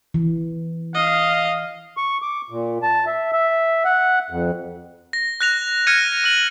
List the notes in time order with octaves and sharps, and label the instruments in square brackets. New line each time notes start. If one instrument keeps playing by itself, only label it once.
[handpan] E3
[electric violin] D#5 [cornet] F5
[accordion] C#6
D6
A#2
A5
E5
E5
F#5
F2
[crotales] A#6
F#6 A#6 F7
F6 G#6 A#6 C#7 D#7
F6 F#7